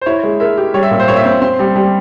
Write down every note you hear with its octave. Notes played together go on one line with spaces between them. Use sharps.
C5
E4 C#5
G#3
A#4 E5
G4
G3 C#5
E5
A#2
C5
A#2 C#5
E5
C4
C4 C6
G3
G3